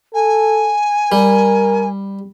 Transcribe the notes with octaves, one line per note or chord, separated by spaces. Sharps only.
A4 G#5
G3 A#4